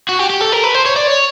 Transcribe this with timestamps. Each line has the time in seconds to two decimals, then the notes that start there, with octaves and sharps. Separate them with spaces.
0.09 F#4
0.19 G4
0.29 G4
0.41 A4
0.52 A#4
0.63 B4
0.74 C5
0.85 C#5
0.96 D5
1.07 C#5